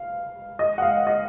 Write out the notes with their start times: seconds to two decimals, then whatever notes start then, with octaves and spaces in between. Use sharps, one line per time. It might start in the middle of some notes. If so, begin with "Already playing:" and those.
Already playing: F5
0.59 D#5
0.78 F#5
0.82 F5
1.07 D#5